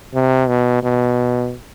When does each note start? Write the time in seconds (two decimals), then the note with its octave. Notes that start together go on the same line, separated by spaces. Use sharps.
0.14 C3
0.49 B2
0.83 B2